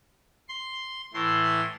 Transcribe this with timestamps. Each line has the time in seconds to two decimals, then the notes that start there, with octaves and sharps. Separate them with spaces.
0.48 C6
1.14 A2 E3 C6